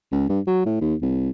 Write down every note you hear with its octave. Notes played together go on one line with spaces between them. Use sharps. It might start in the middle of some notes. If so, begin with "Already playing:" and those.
C#2
G2
F#3
A2
D#2
C2